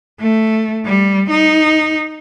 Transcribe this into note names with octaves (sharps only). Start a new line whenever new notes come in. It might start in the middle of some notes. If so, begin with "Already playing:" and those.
A3
G3
D#4